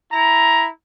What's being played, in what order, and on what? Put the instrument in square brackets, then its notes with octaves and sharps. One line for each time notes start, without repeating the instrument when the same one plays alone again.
[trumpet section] E4 A#5